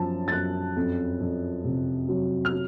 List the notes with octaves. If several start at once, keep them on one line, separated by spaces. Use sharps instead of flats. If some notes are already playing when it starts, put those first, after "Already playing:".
Already playing: F#2 F3 A5
A6
F#2 F#6
F2
F2
C3
F#3
F6
F#3